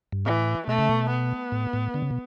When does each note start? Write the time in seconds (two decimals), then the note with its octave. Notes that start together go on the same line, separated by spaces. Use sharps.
0.12 G2
0.25 A2 E3
0.67 B2 A3
0.78 C#3
0.89 B2
1.10 B3
1.52 A2
1.73 A2
1.94 D3
2.02 C#3
2.11 B2